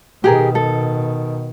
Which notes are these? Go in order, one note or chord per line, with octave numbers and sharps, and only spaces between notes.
B2 D#3 G4 G#4 A#4
A4